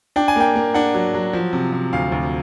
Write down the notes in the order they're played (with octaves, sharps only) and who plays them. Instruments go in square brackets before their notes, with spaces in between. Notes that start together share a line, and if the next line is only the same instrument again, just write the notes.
[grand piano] D4 G5
G#5
A#3 G5
A#3
D4 F#5
F#3
F#3
F3
C3
C3
D2 F5
D2